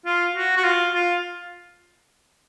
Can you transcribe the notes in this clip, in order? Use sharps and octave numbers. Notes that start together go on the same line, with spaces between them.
F4
F#4
F#4
F4
F4